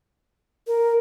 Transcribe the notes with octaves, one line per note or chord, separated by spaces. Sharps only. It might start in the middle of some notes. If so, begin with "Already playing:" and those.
A#4